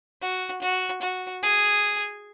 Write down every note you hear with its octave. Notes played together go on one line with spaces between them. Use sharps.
F#4
F#4
F#4
G#4